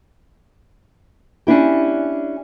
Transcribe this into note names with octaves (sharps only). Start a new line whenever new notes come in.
C#4 D4 E4 G4